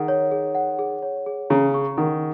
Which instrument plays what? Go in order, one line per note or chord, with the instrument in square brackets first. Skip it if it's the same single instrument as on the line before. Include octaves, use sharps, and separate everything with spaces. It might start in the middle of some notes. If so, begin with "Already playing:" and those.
Already playing: [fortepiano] D#3 [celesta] G#4 F#5
[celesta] C#5
G#4
F#5
G#4
C#5
G#4
[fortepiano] C#3 [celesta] A#5
[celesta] C#6
[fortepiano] D#3 [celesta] F#5